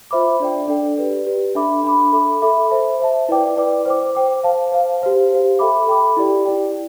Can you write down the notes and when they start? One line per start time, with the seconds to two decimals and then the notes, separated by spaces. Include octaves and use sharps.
0.11 F4 C5 E5 B5 D6
0.40 D4 A4 D5 G5
0.68 D4 A4 D5 G5
0.98 G4 B4 D5
1.27 G4 B4 D5
1.55 D4 A4 E5 B5 D6
1.84 D4 A4 E5 B5 D6
2.13 A4 E5 B5 D6
2.42 A4 E5 B5 D6
2.70 C5 E5 A5
3.00 C5 E5 A5
3.29 E4 B4 D5 G5 D6
3.57 E4 B4 D5 G5 D6
3.85 C5 G5 D6
4.15 C5 G5 D6
4.44 C5 F5 A5
4.72 C5 F5 A5
5.02 G4 C5 F5
5.30 G4 C5 F5
5.59 A4 E5 G5 B5 D6
5.87 A4 E5 G5 B5 D6
6.17 E4 G4 D5 G5
6.45 E4 G4 D5 G5